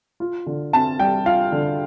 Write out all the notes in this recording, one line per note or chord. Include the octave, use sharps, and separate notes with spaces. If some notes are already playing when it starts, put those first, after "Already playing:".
F4
D3
C4 A5
G3 G5
F4 F5
D3